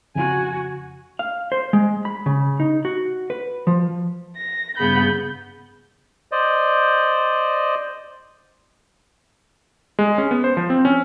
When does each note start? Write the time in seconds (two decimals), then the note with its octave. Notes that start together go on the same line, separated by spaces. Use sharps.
0.15 F2 C#3 F#4 G#5
1.19 F5
1.52 C5
1.73 G#3
2.05 B5
2.26 C#3
2.60 D#4
2.85 F#4
3.30 B4
3.67 F3
4.36 A#6
4.78 G2 C#3 B3 G#4 B5 G6
6.32 C5 D5 D#5
9.99 G#3
10.18 C#4
10.31 B3
10.44 C5
10.57 F3
10.70 C4
10.85 C#4